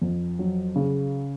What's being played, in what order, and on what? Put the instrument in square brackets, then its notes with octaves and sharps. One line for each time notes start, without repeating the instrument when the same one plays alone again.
[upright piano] F2
F#3
C#3